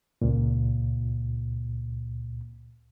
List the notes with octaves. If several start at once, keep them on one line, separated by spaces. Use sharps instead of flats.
C#2 A#2